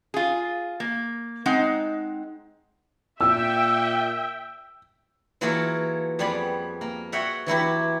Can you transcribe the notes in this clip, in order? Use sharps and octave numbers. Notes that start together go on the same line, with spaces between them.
F4 G#4
A#3
G#3 C4 D#4 F#5
A#2 E5 G5 E6
E3 F#3 A#3 F4 G#4 A4
F2 G3 B3 G#4 D5 B5
A#3
F#4 C#5 E5 F#5 G5
E3 F#3 E4 G4